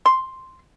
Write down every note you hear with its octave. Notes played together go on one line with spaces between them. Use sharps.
C6